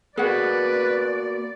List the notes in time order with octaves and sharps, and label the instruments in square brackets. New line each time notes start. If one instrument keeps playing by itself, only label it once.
[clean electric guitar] A#3 B3 F#4 [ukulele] G#4 F#5 [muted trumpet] B4 [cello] D5